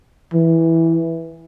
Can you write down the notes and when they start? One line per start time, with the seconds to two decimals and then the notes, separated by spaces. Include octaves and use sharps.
0.33 E3